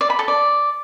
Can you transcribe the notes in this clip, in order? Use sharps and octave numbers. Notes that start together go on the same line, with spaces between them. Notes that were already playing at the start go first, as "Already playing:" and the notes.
D5
B5
A4
D5